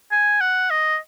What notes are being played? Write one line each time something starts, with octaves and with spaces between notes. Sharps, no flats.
G#5
F#5
D#5